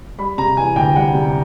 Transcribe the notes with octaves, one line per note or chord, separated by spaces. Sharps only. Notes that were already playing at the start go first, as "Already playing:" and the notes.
G3 B5
C3 A#5
E3 G#5
D2 G5
G3 F#5
C3